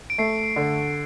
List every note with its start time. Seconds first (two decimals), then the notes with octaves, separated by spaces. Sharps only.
0.10 D7
0.18 A3 C7
0.56 D3